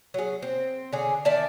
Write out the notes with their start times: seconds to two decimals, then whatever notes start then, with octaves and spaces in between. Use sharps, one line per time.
0.14 F#3 G#4
0.42 C4
0.93 D3 C#4 G#4
1.25 D#3 D5 E5 A5